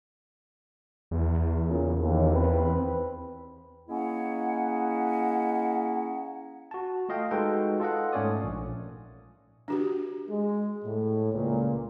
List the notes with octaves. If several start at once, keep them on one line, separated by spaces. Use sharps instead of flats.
E2
A#2 C#3
D#2
C4 B4
A#3 C#4 E4 G#4 D#5 F#5
F#4 A5
A3 F4 D#5 F5 G5
G#3 D#4 F#4 A4 B4 G5
F4 A4 D#5 F#5
G#2 A3 C#4 C#5 D5 D#6
A#1
D4 F#4 G4
G#3
A2
C#2 A#2